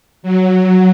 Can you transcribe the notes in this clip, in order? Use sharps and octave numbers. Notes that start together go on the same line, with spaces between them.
F#3